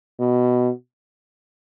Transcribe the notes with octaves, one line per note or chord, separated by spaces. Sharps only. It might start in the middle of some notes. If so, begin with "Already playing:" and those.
B2